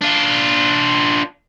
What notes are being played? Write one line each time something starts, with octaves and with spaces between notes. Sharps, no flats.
D4 F4